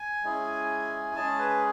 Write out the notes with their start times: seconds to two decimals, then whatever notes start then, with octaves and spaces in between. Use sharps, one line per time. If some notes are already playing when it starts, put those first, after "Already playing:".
Already playing: G#5
0.24 G#3 C#4 E4 G#4
1.16 G#3 C#4 G#4 A5
1.39 B4